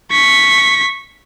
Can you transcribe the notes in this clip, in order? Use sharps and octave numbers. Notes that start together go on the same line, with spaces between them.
C#6 B6